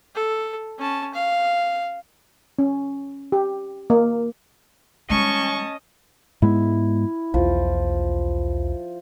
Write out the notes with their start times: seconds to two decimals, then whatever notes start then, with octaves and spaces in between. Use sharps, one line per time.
0.15 A4
0.78 C#4 A5
1.14 F5
2.59 C#4
3.32 G4
3.90 A#3
5.10 G3 G#3 C#4 D#5 A5 C#6
6.42 G#2 G#3 B3 E4
7.34 B1 E2 F3